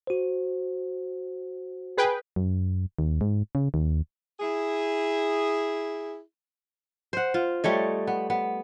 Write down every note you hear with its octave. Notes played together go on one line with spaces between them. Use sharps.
F#4 C5
G#4 B4 G5
F#2
D#2
G#2
C#3
D#2
E4 G#4
C5 F#5
F4
G3 A3 C#5 D#5
B3
B3